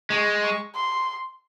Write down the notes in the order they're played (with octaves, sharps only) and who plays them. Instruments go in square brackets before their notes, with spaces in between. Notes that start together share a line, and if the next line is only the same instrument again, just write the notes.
[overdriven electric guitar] G#3 [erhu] C#6
[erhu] C#6
C6